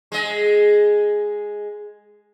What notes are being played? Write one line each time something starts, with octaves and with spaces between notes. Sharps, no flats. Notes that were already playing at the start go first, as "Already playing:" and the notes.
G#3 D#5